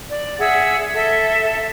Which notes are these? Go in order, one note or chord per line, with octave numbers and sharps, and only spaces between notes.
D5
G#4 E5 F#5 E6
A4 E5